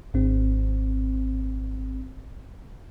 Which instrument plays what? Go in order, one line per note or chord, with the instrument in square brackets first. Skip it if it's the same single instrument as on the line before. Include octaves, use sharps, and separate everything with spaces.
[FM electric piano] G#1 C4